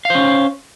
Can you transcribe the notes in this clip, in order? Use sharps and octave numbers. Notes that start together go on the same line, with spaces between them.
C#4 C5 F5